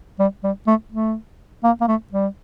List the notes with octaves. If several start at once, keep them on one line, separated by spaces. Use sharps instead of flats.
G3
G3
A3
A3
A#3
A#3
A3
G3